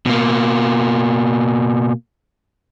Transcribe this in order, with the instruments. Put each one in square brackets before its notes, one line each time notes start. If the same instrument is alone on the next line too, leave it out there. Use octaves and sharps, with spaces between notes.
[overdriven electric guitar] B2 A#3